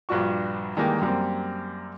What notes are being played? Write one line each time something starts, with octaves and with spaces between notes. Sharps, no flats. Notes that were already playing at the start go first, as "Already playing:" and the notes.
A#1 G2 F3 D4 F#4 C#6
D#3 E3 G3 G#3 A#3
F#2 G3 A#3 C4